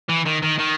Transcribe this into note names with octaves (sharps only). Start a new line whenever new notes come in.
E3
D#3
D#3
D#3